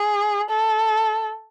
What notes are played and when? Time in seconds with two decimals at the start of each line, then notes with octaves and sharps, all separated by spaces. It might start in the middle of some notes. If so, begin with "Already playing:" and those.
Already playing: G#4
0.50 A4